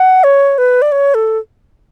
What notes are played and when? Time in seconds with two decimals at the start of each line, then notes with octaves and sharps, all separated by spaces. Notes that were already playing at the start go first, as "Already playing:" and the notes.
Already playing: F#5
0.24 C#5
0.58 B4
0.82 D5
0.92 C#5
1.14 A4